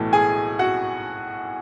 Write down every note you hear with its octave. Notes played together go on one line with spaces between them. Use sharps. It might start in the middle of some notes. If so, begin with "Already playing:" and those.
Already playing: B1 A2 E3 A3
G#4 G#5
F#4 F#5